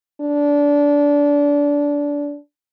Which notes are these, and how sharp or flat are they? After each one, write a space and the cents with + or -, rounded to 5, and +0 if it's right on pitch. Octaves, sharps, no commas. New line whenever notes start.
D4 -20